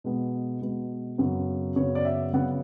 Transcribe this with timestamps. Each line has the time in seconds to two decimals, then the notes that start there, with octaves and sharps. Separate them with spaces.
0.04 B2 G#3 B3
0.61 B2 G#3 B3
1.18 F#2 C#3 F#3 B3
1.76 F#2 C#3 F#3 B3 C#5
1.95 D5
2.05 E5
2.33 C#3 F#3 B3 F#5